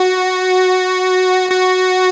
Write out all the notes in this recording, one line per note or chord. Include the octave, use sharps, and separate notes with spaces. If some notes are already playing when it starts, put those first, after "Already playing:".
Already playing: F#4
F#4